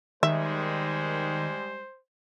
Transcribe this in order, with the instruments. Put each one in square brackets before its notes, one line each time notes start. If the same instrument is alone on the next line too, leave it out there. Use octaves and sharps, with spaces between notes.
[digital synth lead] D#3 [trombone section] G3 G#3 [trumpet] C5 [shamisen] E5